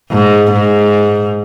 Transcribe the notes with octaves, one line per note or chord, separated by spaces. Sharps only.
G#2
G#2